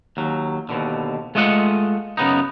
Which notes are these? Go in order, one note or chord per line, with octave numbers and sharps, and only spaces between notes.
D#2 F#3
D#2 B2 D3
G#3 A3 F4 D#5 F#5
F#2 C#3 B3 D#4